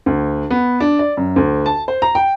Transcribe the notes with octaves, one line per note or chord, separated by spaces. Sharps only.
D2
B3
D4
D5
F#2
D2
A5
C5
A#5
G5